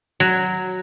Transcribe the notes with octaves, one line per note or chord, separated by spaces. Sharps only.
F#3